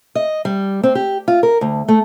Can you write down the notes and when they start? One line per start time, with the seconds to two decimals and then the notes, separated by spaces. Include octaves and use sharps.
0.15 D#5
0.45 G3
0.83 C4
0.95 G4
1.28 F4
1.43 A#4
1.61 D2
1.88 A3